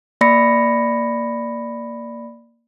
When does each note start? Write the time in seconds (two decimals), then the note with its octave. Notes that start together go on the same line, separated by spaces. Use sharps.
0.21 A#3 D5 B5 A#6 C#7